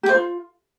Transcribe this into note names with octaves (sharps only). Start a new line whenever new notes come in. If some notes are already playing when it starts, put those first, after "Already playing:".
G4
C5
F4